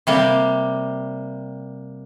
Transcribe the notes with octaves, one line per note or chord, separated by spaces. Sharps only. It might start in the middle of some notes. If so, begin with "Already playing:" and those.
C3 G3 A#3